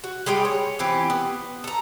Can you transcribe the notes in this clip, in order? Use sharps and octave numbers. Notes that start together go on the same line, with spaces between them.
F#4
G3 G#3 D#5 G5
C#5
E3 C4 F4 G4
B3
A4 A#5